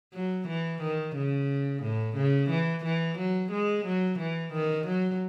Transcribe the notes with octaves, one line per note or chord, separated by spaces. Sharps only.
F#3
E3
D#3
C#3
A2
C#3
E3
E3
F#3
G#3
F#3
E3
D#3
F#3